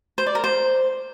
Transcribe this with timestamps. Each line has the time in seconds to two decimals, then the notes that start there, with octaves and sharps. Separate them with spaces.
0.18 C5
0.26 D5
0.35 A#4
0.44 C5